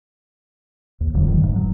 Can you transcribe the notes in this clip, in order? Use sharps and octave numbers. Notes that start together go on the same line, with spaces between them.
D#2
D1 F2 D3 F#3
F1 G2 D#3
F1 G#2
F#3